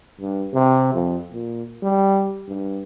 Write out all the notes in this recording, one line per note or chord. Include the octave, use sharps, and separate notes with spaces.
G2
C3
F2
A#2
G3
G2